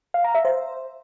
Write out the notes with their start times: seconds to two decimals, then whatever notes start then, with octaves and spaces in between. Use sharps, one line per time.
0.14 F5
0.24 A#5
0.35 E5
0.45 C5